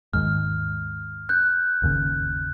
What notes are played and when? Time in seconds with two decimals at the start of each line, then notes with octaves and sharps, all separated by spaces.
0.13 D#2 G#2 F6
1.29 F#6 G6
1.82 G1 D#2 C#3